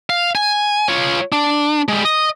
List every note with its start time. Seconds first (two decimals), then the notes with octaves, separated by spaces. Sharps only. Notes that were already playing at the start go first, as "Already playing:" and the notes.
0.10 F5
0.35 G#5
0.88 F4 C#5
1.32 D4
1.88 G3 G#3
2.05 D#5